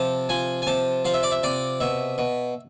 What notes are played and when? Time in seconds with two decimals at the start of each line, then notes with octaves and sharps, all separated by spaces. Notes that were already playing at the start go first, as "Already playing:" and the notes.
Already playing: C3 F3 A5
0.29 F3 G#5
0.62 G#5
0.67 C3 A5
1.05 F3 F5
1.14 E5
1.23 D5
1.31 E5
1.43 C3 D5
1.80 B2 E5
2.18 B2